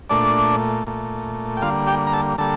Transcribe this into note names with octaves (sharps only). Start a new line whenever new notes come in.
A#2 A3 D4 D5
A#2 A3
G5
D3 G3 A#3 F4 F5
G4 G5
A#5
A4 A5
D3 G3 A#3 A4 A5